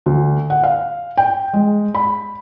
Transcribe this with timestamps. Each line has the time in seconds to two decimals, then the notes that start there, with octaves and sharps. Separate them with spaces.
0.06 D2
0.50 F#5
0.63 F5
1.17 G5
1.54 G#3
1.95 B5